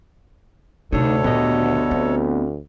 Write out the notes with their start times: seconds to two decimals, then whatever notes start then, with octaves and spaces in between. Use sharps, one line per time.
0.92 D2 C3 A3 D4 D#4 A4 C#5
1.24 A#2 D#3 B3 G4 D#5
1.91 C4